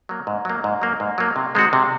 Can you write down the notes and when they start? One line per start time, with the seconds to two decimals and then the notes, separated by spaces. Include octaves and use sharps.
0.09 F#3 A#3
0.27 G#2
0.45 F#3 A#3
0.64 G#2
0.81 F#3 A#3
1.00 G#2
1.18 F#3 A#3
1.36 C3
1.55 D#3 G#3 C4 F#4
1.73 C3